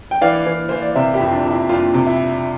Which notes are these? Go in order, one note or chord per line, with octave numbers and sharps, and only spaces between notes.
G5
E3 D5 F5
E3
E3 C5
D5
C3 C5 E5
E4 G4
F2
D4
F2
E4
F2 D4 F4
C3
E4